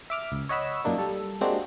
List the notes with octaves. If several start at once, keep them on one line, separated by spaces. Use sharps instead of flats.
E5 D6 F6
C#2
C#5 D#5 F#5 B5 E6
F#2 A#2 A#3 D4 D#4
G3 A4
G#3 A#3 C4 D4 F#4 G4